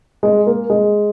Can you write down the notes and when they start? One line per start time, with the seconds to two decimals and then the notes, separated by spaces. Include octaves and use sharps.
0.23 G#3
0.47 A#3
0.70 G#3